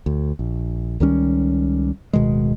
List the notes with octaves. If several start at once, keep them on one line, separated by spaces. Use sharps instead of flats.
D2
A#1
C#2 D#3 G3 C#4
D1 B2 D#3 G#3